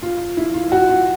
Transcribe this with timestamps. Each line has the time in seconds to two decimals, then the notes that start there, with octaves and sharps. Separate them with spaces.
0.02 F4
0.37 E4
0.54 F4
0.72 F#4
0.89 F4